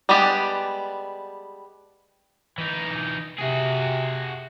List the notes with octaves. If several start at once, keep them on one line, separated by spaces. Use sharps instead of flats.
G3 G#3 B3 D4 G4
E3 D#4
C3 F#4 G#4